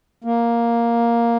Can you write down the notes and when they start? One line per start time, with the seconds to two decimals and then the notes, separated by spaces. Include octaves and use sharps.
0.24 A#3